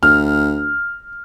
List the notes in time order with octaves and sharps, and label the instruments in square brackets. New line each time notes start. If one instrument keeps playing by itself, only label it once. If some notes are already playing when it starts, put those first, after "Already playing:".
[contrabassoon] D2 [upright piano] F6